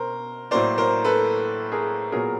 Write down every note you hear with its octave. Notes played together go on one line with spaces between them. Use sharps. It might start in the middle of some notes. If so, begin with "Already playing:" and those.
Already playing: B2 A#4 C5
A2 F#3 A#3 C5 D5
A#4 C5
A4 B4
G#4 A#4
A#2 F#3 B3 G#4 A#4